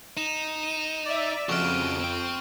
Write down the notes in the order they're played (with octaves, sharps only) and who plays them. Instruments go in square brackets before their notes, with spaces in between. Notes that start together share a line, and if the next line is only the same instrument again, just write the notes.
[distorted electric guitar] D#4 [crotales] E7 F7
[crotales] D#7
[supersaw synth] D5 E5
[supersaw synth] F2 D7 [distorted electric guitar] C#3 F#4 [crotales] C#6 F6
[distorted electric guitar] C4 G5